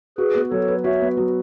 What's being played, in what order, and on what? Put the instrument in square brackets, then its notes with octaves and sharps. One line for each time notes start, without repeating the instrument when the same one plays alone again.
[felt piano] F#4 [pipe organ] G#4 B4
[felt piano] B3
[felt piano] F#3 [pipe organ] A4 C#5
[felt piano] B4
[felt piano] F#4 [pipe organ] C#5 E5
[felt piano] B3
F#3